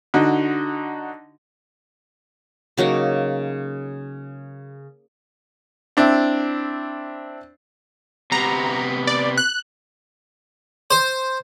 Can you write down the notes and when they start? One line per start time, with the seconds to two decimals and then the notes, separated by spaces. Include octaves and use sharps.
0.14 D3 D#4 F#4
2.77 C#3 F#3 A#3 D#4
5.97 C4 D4 E4
8.32 C3 B3 A#5
9.07 D5
9.38 F#6
10.91 C5